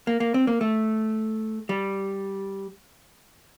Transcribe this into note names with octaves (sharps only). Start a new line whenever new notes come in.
A#3
A#3
C4
A#3
A3
G3